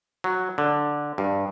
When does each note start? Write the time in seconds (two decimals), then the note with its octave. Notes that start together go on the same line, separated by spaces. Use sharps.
0.24 F#3
0.58 D3
1.18 G2